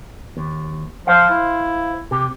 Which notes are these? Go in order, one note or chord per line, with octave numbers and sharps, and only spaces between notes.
D#2
F3 C5 F5
E4
C3 G4